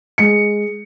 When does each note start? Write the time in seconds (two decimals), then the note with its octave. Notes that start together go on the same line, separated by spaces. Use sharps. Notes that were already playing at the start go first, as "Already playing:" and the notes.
0.18 G#3 C#7